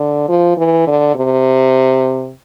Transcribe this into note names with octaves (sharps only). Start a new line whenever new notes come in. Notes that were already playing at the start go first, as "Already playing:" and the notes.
Already playing: D3
F3
E3
D3
C3